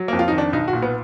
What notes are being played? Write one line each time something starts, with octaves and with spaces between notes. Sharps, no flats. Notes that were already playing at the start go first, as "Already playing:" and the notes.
Already playing: F#3
F2 A#3
F4
D#3 D#4
D4
B1 D#4
F#4
A#2
B3